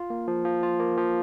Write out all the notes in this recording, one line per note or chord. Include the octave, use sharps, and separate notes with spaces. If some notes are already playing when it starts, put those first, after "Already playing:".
Already playing: F4
A#3
F3
F3
F4
A#3
F3